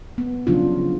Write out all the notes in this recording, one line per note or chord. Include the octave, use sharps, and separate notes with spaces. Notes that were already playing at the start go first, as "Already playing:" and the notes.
B3
C#3 F3 F#3 D4 F4 F#4